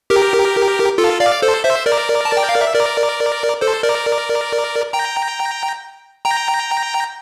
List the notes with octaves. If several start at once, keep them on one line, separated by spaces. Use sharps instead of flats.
G4 A#4
F4 A4
D5 F5
A4 C5
C5 E5
A#4 D5
A5
G5
F5
E5
A#4 D5
A4 C5
A#4 D5
G5 A#5
G5 A#5